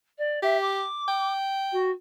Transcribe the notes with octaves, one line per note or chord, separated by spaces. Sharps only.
D5
G4 E5
D6
G5
F#4